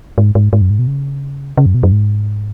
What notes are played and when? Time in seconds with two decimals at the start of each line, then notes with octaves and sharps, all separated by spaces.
0.18 G#2
0.35 G#2
0.53 G#2
0.61 F#2
0.70 G#2
0.79 B2
0.87 C#3
1.57 C#3
1.66 F#2
1.74 B2
1.83 F#2
1.92 G#2